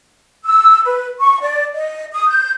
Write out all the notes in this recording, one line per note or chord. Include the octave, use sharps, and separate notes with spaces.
E6
B4
C#6
D5
D#5
D#6
G6